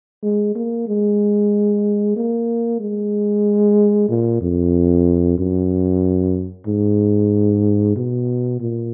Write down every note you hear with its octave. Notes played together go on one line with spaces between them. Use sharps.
G#3
A#3
G#3
A#3
G#3
A#2
F2
F#2
G#2
B2
A#2